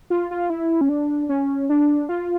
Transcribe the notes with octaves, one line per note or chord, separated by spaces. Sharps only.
F4
F4
E4
C#4
D4
C#4
D4
F4